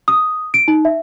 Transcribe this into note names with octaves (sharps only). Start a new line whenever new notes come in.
D#6
D7
D#4
E5